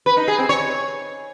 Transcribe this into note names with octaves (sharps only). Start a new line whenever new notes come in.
B4
D#4
G#4
C4
C#5